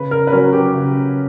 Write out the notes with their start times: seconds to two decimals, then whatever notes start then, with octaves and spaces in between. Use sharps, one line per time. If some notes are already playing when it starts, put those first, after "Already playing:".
Already playing: C#3 B4
0.11 A#4
0.27 B4
0.32 F#3 C#4 A#4
0.53 G4
0.74 C#3